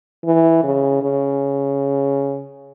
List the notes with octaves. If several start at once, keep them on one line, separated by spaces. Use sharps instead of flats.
E3
C#3
C#3